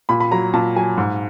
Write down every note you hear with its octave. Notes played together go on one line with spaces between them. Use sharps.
A#2 B5
B5
F#3 A#5
A#2 A5
F#3 G#5
G#2